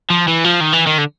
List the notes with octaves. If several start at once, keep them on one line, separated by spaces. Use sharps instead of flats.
F3
E3
F3
D#3
E3
D#3
D3